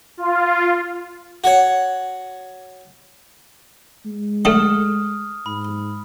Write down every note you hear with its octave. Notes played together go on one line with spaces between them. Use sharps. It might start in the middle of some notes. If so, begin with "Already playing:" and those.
F4
F#4 C#5
G#3
D3 A3 D#6 F6
G#2 B5